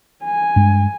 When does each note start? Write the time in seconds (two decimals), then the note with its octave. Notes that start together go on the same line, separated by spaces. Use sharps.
0.24 G#5
0.56 G2 G#3